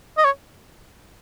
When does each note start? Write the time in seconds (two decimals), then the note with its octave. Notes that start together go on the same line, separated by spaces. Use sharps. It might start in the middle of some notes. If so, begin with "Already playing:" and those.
0.17 D#5
0.25 C#5